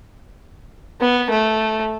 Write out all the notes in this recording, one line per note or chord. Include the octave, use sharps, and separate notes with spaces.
B3
A3